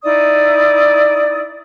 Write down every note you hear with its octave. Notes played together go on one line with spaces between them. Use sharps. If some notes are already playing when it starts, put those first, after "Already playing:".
D#4 E4 D5 D#6